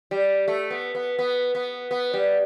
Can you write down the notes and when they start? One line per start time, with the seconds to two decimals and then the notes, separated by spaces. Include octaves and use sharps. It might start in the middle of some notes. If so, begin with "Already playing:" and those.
0.11 G3
0.48 A3
0.70 B3
0.95 B3
1.19 B3
1.55 B3
1.91 B3
2.13 G3